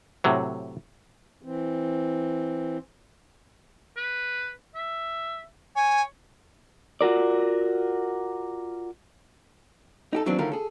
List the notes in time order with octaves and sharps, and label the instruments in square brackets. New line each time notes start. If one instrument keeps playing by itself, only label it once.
[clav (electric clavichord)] A2 C3 F#3
[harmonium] E3 C4
[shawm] B4
E5
[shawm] C#5 [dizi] G#5
[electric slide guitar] F4 F#4 A#4 D5
[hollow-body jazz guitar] D#4 G4 A4
D#3 E3 F#3 A#3 C4 D4
D3 D#3 A3 C#4 F4 A#4
G#4 A4